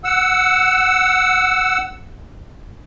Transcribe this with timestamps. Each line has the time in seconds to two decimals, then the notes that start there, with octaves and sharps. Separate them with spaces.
0.04 F#5 E6